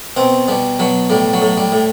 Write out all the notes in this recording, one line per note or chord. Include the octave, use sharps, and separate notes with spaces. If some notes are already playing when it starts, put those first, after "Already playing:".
B2 C4
B2 G3
B2 F#3
A2 G3
F#3
A2
G3
A2